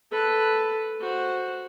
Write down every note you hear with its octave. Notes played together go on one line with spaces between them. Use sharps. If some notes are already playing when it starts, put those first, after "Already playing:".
A4 B4
F#4 C5